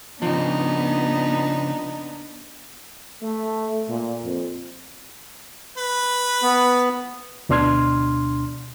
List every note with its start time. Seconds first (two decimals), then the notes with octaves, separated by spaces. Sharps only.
0.22 C#3 F3 B3 D4 D#4
3.22 A3
3.89 A#2
4.24 F2
5.78 B4
6.42 B3
7.49 D2 B2 D4 C6 F6 G#6